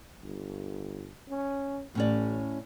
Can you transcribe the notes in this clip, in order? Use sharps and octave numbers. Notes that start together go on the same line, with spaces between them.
G1
C#4
A1 A2 C#4 D5